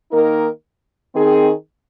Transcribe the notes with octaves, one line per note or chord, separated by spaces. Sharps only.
D#3 A#3 D#4 A#4
D#3 C4 G#4